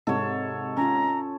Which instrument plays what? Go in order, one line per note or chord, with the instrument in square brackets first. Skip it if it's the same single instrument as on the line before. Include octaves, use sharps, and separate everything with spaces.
[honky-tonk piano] G#2 C3 [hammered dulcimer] A4 C#5 [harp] C7
[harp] C#4 F4 [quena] A#5